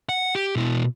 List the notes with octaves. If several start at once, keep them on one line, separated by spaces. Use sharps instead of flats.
F#5
G4
B2 E4